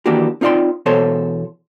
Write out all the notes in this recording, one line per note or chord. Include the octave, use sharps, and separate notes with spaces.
D#3 E3 A#3 D4 F#4 G4
C4 D#4 F4 D5 G5 C6
E2 B2 A4 C5 C#5